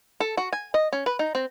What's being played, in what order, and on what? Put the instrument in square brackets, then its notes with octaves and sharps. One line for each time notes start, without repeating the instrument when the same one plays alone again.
[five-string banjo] A4
F#4
G#5
D#5
C#4
B4
D#4
C4